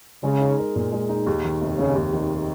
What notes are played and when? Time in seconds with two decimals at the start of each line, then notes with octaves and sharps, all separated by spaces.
0.23 C#3 G#3
0.41 D#4
0.58 A#4
0.76 A#2
0.92 G#3
1.09 D#4
1.26 D#2
1.44 D#3
1.62 F1
1.78 F1 C#3
1.95 D#2
2.13 D#3